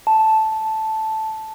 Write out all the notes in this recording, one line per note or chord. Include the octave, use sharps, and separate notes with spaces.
A5